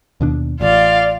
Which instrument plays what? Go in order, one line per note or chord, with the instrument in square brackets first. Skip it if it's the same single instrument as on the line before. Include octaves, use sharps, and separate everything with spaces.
[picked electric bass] D#2 B2 D4
[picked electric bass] A1 [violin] F4 F5 [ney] D5